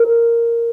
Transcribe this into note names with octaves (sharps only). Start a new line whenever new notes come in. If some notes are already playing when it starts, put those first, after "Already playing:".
Already playing: A#4